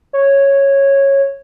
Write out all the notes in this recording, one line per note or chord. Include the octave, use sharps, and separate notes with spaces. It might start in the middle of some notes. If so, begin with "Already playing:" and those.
C#5